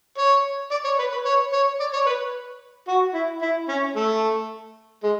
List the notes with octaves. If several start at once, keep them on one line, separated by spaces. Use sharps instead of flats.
C#5
D5
C#5
B4
B4
C#5
C#5
D5
C#5
B4
F#4
E4
E4
C#4
A3
G#3